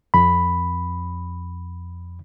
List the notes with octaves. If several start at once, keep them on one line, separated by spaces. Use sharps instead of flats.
F2 B5